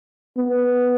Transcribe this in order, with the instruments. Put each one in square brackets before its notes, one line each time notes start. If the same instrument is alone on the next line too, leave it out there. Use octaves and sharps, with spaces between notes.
[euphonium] B3